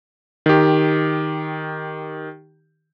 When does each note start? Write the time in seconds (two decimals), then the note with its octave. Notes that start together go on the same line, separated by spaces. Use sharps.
0.46 D#3 G4